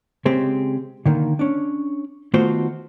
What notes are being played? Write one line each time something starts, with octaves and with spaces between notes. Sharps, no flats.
C#3 G#3 C4 G4
D3 D#3 A#3
C#4 D4
D#3 A3 B3 F4 F#4 C5